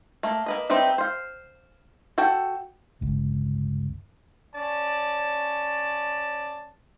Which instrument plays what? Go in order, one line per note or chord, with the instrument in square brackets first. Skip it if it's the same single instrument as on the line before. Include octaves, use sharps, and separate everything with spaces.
[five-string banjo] A3 A#3
A#3 B4 D#5
G3 C4 D#4 B4 E5
C5 F5
F#4 A4 G5
[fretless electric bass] G1 C#2
[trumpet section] C#4 D5 A5